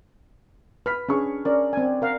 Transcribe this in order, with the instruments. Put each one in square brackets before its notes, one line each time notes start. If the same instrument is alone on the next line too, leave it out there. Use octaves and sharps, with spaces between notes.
[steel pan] B4 [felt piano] F6 B6
[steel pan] C#4 [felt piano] D4 G#4 C#6
[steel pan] C#4 A#4 [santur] D5
[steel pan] C4 G#5
A#4 F5 F#5